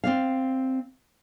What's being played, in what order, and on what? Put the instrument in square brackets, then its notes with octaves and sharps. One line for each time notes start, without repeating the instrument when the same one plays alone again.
[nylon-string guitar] C4 D5 F5